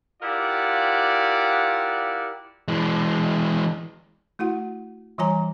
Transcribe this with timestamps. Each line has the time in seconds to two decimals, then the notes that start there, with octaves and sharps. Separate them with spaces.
0.23 E4 F4 G4 A#4 D5 F#5
2.68 E3 G#3
4.39 A3 E4 F#4 F#5
5.18 E3 G3 F4 C#5 G#5 A#5